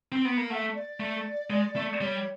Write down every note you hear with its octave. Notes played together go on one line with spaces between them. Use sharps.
C4
B3
A#3
A3 F#5
E5
D5
A3
G#3
A3
G3 C#5